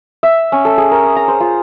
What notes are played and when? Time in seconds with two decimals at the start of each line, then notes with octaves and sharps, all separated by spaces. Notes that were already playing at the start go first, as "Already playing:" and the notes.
0.23 E5
0.52 C#4
0.65 A4
0.78 G#4
0.91 A#4
1.04 D#6
1.16 A#5
1.28 C5
1.40 F4